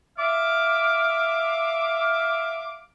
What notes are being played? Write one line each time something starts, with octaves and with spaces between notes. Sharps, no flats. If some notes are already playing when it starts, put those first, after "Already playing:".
E5 F5 D6